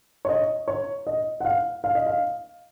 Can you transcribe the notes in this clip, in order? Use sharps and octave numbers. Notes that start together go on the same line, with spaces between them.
C#5
D#5
C#5
D#5
F#5
F5
F5
D#5
F5